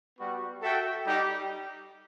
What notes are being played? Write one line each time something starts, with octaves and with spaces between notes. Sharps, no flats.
G3 B3 F#4
F#4 A4 E5 G5
G3 D#4 G4